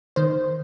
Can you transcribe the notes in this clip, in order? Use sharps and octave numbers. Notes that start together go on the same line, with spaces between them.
D#3 C5